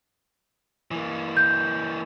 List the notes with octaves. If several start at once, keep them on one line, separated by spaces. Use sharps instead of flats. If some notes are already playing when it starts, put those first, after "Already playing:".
E3 A#3
G6